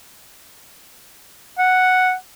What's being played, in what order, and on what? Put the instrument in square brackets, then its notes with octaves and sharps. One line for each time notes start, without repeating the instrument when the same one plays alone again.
[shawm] F#5